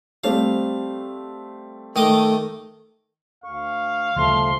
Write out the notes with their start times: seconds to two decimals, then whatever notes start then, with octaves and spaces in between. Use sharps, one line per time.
0.24 G3 A3 C4 F5
1.96 D#3 A3 D#5 D6
3.44 D2 F5 C#6
4.16 D2 C#3 F3 G3 A3 C6